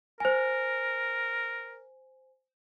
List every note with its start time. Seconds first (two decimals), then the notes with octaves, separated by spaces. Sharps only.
0.20 A#4 C5 G#5